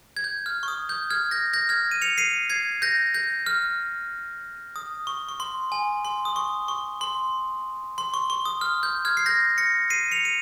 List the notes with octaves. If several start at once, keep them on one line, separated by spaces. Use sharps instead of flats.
G#6
G6
F6
C#6
D#6
G6
F6 G#6
G6 A#6
G6 A#6
F6 G#6
D#7
C#7 F7
C7 D#7
G#6 C7
G6 A#6
G6
F6
D#6
C#6
C#6
C6
G#5
C6
D#6
C#6
C#6
C6
C6
C#6
C#6
D#6
F6
G6
F6 G#6
C7
G6 A#6
A#6 C#7
C7 D#7
C#7 F7
D#7